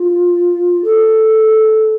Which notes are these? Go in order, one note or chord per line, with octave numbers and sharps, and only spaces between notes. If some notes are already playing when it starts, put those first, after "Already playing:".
Already playing: F4
A4